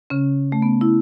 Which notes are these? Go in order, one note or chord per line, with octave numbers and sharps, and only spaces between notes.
C#3 C#4
A3
B3
E4